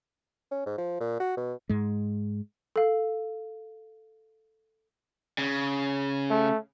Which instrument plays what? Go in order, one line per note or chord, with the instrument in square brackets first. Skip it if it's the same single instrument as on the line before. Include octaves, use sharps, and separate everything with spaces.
[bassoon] C#4
G#2
F3
A#2
F#4
B2
[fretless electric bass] G#2 G#3
[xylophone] A4 F5
[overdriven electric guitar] C#3
[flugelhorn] A3